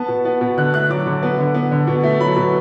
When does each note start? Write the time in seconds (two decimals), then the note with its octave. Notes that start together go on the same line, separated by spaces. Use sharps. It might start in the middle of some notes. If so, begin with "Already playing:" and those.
Already playing: B3 A5
0.08 B2
0.25 B3
0.41 B2
0.57 D3 F#6
0.74 A3 F#6
0.89 F#3 D6
1.07 D3
1.23 B3
1.38 D3
1.54 B3
1.72 D3
1.87 B2
2.03 A3
2.20 F#3 B5
2.36 B2